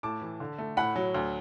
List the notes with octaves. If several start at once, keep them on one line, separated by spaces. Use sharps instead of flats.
A2 A5 D6
E3
D3
A3
A2 F#5 B5
F#3
D2